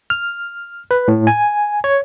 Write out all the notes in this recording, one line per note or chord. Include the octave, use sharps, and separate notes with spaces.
F6
B4
A2
G#5
C#5